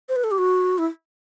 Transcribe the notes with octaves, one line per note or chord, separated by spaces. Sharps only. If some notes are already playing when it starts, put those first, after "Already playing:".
C5
B4
A4
G4
F#4
E4